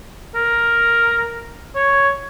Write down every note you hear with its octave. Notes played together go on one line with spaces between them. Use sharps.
A#4
C#5